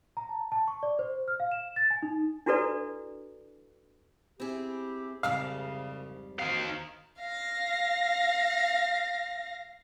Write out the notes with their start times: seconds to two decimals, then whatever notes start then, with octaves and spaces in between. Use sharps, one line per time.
0.17 A#5
0.29 A5
0.52 A5
0.68 C#6
0.83 D5
0.99 C5
1.28 F6
1.40 F5
1.52 E7
1.76 A6
1.90 G#5
2.03 D#4
2.46 D4 E4 F#4 A4 B4 D5
4.40 C4 E4 G4 G#4
5.23 C2 F2 G#2 C#3 G3 F5
6.39 C4 D#4 F#4 F5
7.20 F5 A#6